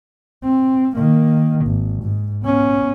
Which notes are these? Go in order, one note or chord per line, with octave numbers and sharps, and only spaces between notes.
C4
D#3 A#3
G#1
G#2
B3 C#4